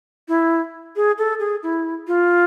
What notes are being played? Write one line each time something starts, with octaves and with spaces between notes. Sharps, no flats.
E4
G#4
A4
G#4
E4
F4